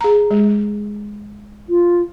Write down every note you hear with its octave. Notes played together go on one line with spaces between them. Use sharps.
G#4 A#5
G#3
F4